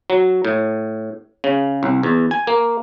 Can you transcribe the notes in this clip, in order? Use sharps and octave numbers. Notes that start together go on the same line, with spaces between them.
F#3
A2
C#3
C2
E2
G#5
A#3